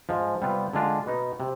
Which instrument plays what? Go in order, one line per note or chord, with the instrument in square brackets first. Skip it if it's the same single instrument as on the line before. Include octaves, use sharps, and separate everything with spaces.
[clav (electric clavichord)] G#2 F3 G#3
C3 G3 B3 F4
D3 G#3 D4 F4
B2 B3 D#4
C3